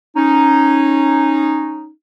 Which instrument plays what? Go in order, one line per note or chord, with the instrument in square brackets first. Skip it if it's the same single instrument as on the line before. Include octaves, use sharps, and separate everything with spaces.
[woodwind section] C#4 D#4